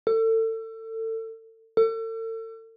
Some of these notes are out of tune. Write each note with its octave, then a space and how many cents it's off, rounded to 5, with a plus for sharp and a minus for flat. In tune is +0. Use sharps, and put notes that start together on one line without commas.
A4 +30
A4 +40